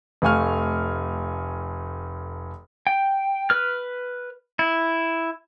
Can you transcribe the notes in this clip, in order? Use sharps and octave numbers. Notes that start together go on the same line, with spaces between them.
F1 A3 F5 G#5 C#6 F6
G5
B4 F6
E4